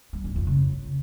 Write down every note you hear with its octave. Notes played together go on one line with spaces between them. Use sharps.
G3
F#2
F2
C#3